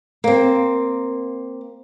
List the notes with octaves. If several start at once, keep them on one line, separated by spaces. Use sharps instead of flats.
A#3 C4